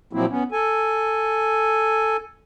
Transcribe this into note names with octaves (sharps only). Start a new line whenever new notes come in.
A#2 F3 F#3 A#3 C4 E4
B3 C#4
A4 G#5